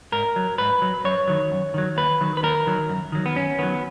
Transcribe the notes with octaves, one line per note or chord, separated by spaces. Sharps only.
G#2 A#4
F#3
G#2 B4
F#3
F#2 C#5
D#3 F#3
F#2
D#3 F#3
D#2 B4
D#3 F#3
B4
D#2 A#4
D#3 F#3
F#2
D#3 F#3
B3
F#2 C#4
D#3 F#3 B3